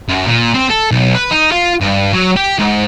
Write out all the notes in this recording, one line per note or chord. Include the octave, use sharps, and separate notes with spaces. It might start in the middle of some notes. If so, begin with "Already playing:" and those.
F#2
A#2
C4
A4
B1
B4
D#4
F4
G2
F#3
G4
G#2